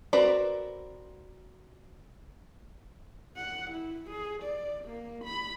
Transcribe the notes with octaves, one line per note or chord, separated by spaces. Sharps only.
C4 F#4 A#4 B4 D5
F#5
E4
G#4
D5
A#3
B5